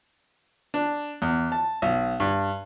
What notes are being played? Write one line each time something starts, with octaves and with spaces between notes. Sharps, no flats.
D4
E2
A5
B1
G2